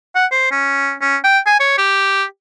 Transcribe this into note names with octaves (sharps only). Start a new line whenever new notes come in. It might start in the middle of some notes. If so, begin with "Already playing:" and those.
F#5
C5
C#4
C#4
G5
G#5
C#5
G4